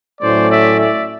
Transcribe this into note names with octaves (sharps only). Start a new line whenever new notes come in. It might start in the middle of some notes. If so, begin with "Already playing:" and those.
A2 F#3 A3 C#4 C5 D5
D5 E5
D5 E5